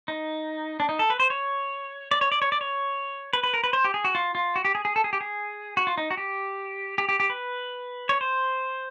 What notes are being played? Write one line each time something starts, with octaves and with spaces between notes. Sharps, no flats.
D#4
D4
D#4
A4
B4
C5
C#5
D5
C#5
D5
C#5
D5
C#5
B4
B4
A#4
B4
C5
G4
G#4
F#4
F4
F4
F#4
G4
G#4
G#4
A4
G#4
G4
G#4
F#4
F4
D#4
F#4
G4
G4
G4
G4
B4
C#5
C5